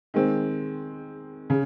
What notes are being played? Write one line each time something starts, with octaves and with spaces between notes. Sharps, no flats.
D#3 G#3 C4
C#3